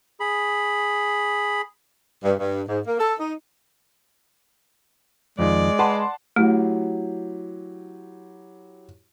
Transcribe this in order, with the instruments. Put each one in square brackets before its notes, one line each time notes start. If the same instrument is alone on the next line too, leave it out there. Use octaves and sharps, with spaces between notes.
[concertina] G#4 B5
[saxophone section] G2
G2
G#2
A#3
A4
D#4
[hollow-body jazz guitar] F2 D#3 [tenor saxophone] G#3 [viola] D5
[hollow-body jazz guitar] B4 [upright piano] F#5 A5 C6
[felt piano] F#3 E4 G4 [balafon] A3